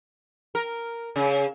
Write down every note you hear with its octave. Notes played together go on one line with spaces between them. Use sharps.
A#4
C#3